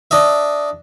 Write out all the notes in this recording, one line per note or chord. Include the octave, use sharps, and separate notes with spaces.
D4 D#5 E5